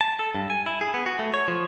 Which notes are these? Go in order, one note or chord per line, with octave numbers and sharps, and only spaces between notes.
A5
A4
G2
G#5
E4
G#4
B3
F#4
A3
C#5
F3